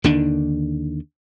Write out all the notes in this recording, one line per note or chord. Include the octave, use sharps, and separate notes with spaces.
D#2 D3 D#3 D4